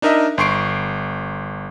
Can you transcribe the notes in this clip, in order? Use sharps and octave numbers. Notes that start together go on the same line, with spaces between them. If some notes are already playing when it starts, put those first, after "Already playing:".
D4 D#4 A#4 D#5 E5
G1 C6 C#6 C7 D7